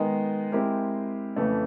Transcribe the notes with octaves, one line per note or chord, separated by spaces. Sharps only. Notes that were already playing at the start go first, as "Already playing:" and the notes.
Already playing: D#3 G#3 B3 D#4
G#3 C4 E4 G4 A#4
F2 C#3 E3 A3